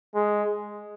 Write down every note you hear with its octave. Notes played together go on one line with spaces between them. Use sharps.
G#3